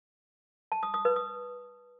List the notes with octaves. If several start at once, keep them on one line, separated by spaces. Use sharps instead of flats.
A5
D#6
D#6
B4
D#6